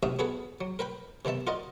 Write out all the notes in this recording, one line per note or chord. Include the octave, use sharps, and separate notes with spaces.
A1 C3 F#4 E5 F5 D#6
B3 F#4 G#4 A4 B4
F#3
A#4 B4 G5 B5
C3 D#3 B3 E5 A5
F4 F#4 A#4 D5 D#5